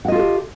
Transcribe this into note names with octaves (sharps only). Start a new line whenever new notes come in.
F4 G4 A4 D#5 F#5